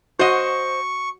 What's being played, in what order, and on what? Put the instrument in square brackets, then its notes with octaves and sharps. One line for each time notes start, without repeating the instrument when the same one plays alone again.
[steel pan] F#4 [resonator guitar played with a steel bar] C5 D#5 [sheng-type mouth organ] C#6